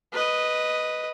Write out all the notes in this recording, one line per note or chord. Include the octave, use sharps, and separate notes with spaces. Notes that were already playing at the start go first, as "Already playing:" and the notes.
B4 D#5